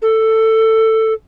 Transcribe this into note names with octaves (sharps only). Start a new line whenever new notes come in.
A4